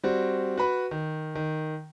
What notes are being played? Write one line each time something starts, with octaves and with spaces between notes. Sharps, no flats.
G3 C4 F#4
F#4 B4 B5
D#3
D#3